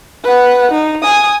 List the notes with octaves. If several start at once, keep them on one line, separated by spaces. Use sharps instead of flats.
B4 F#5
D#4
G#5 D#6